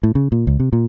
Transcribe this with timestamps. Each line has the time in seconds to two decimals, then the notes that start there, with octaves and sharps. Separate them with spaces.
0.03 A2
0.15 C#3
0.32 A#2
0.47 C#2
0.60 C3
0.73 A#2